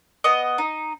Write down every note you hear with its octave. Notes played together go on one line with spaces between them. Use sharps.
B3 D#5
D#4